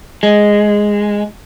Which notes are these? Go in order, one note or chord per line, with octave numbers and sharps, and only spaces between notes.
G#3